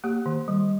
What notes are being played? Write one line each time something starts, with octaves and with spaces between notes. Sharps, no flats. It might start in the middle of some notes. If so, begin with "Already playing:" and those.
A#3 G4
D#3
G3